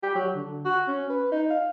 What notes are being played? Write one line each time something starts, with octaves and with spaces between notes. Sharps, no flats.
G4
F#3
D3
F#4
C#4
B4
D#4
F5